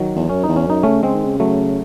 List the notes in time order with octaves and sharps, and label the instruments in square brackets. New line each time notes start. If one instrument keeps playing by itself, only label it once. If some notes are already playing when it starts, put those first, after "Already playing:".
Already playing: [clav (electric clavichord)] D#3 F#3
[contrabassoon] E2
[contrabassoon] F#2 [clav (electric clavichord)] C#4
[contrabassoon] E2 [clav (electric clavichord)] D#4
[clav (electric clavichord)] C#4
[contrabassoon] F#2 [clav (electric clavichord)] D#4
[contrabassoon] C#3 [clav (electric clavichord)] A3 C#4
[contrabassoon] C#3 [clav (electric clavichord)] G#3 C4
[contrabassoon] D#3
C#3
[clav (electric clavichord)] F#3 A3